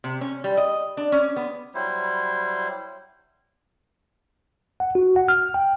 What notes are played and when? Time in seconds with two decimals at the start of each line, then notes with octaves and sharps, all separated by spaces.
0.04 C3
0.21 C#4
0.44 G3
0.57 D#5
0.97 D4
1.12 C#4
1.36 B3
1.74 F#3 G3 E4 C5
4.80 F#5
4.95 F#4
5.16 F#5
5.28 F6
5.54 G5